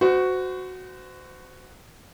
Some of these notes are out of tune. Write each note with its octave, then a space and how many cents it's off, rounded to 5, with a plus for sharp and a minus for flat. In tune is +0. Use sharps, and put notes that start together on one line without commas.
F#4 +0 C5 -35